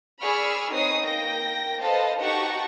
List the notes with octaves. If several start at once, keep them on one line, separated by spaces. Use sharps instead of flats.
G#4 D5 B5 C#6 E6 F6
C4 D#4 B4 C#5 D#6 C7
A#3 G5 A#6
A4 B4 C5 D#5 F5 A5
D#4 F#4 G4 F#5 A5 C#6